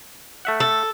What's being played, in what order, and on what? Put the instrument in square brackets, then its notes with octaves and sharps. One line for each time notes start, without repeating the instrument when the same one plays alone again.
[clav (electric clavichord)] A3 E5 F#5
[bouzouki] A4